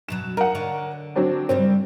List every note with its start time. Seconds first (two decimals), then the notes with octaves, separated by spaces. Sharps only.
0.08 F#2 B2 F#3 E7
0.37 D#4 A#4 F#5
0.55 D3 C#5
1.16 F#3 C4 D4
1.49 G2 C#3 G3 C4